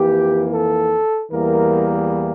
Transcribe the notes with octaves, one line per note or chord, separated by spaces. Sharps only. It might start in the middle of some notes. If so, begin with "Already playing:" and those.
Already playing: F2 E3 A#3 G4
A4
E2 E3 G3 A#3 A#4